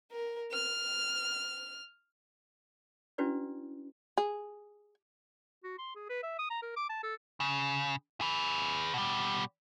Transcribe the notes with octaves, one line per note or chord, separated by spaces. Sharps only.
A#4
F6
C#4 D4 E4 F#4 B4 D5
G#4
F#4
C6
G#4
B4
E5
D#6
A#5
A#4
D6
A5
A4
C#3
G#4 B4
B2 G3